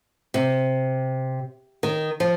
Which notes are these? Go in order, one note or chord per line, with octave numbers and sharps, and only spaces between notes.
C3
D#3
F3